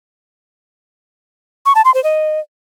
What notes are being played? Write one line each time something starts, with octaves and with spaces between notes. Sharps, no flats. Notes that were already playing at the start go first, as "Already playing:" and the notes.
C#6
A5
C6
C5
D#5